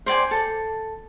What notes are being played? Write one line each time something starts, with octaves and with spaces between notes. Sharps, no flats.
C5 D5 G5 G#5
A4